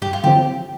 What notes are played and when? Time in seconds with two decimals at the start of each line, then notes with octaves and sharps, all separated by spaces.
0.02 G2 G4
0.13 F4
0.24 D3 F3 C4 G4